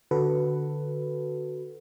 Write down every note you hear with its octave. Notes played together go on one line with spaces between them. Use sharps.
D3 F#4 A4 B4